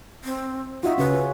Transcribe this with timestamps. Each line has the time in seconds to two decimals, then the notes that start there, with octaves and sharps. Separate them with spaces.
0.24 C4
0.83 D#4 F4 F#4 E5
0.98 C#3 C#4 B4